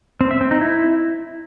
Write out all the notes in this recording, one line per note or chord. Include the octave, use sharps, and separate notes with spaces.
C4
E5
C4
D#4
E4